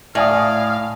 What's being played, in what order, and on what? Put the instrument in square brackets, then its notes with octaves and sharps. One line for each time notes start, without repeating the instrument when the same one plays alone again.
[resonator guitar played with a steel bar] A2 [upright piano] D5 G#5 D#6 [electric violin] F5